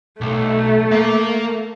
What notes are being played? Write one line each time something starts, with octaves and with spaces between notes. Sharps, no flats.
B1 A3
A#3